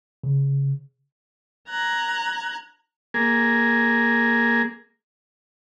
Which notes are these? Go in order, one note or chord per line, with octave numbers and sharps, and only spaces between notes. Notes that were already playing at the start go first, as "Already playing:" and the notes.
C#3
A#5 F#6 G#6
A#3 G#4